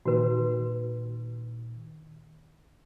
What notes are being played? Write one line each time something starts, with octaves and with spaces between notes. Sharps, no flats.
A#2 D#3 F#4 B4